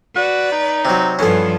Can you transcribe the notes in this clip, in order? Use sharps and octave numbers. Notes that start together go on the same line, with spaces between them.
F#4 B4 D5
D#4
C3 F#3
G2 E3 F3 B3 C#4 A4 C7